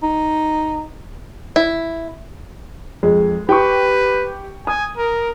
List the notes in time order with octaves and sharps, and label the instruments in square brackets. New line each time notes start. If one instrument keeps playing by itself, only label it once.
[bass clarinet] D#4
[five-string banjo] E4
[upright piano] F2 [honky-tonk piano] G#3
[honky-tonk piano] G4 [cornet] B4 [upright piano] G5 C#6
[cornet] G#5 [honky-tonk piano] D#6
[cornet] A#4